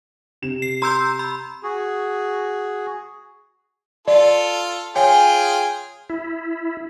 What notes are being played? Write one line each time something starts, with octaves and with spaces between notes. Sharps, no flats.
C3 E7
C7
A#5 C6 E6 G6
B5
F#4 G#4
F4 A4 D5
F4 G#4 C#5 G5 G#5
E4